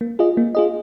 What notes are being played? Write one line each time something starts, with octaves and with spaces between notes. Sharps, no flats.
A#3
F4 G#4 D#5
A#3
F4 G#4 D#5